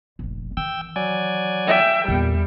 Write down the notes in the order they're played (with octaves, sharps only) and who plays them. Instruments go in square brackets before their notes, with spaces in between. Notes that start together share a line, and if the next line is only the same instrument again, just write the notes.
[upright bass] F1 A#1
[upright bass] D#3 E3 [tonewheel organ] G5 E6
[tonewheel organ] F#3 D5 G#5
[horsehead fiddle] E5 G5
[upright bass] E2 D3 [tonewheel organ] A#2 [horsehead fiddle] G3